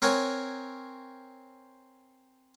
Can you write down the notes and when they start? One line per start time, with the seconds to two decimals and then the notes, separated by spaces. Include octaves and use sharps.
0.02 C4 A#4 C#5 F#5 G#5